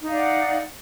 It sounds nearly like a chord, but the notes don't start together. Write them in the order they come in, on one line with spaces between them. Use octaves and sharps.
D#4 F5 D5 F#5